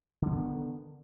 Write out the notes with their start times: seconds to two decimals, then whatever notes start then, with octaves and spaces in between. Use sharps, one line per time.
0.22 D3
0.27 C#4
0.32 B3
0.37 D#3